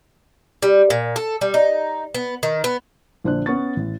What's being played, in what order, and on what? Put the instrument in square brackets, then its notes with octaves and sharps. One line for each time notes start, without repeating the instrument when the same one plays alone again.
[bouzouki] G3
A#2
A4
G3
D#4
B3
D#3
B3
[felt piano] A#1 D3 C5 D5 F#6
B3 C#4 C#6 A6
A1